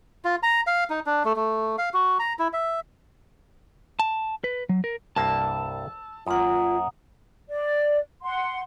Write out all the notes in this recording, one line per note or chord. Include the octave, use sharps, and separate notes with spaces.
F4
A#5
F5
D#4
D4
A3
A3
F5
F#4
A#5
E4
E5
A5
B4
F#3
A#4
C2 G2 A#3 A5 E6
F#2 A#3 F4 F#5 A#5 D#6
D5
F#5 C6